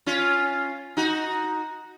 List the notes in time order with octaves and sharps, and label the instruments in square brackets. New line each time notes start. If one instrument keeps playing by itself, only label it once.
[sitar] C#4 F4
D#4 F#4